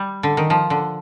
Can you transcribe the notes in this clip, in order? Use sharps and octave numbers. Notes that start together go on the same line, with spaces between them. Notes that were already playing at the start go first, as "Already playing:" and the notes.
Already playing: G3
D3
D#3
F3
D3